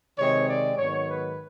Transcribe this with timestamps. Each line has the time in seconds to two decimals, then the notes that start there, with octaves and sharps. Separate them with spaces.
0.18 C3 D#3 G#3 C4 C#5
0.48 D5
0.78 G#2 D#3 F#3 B3 C#5
1.08 B4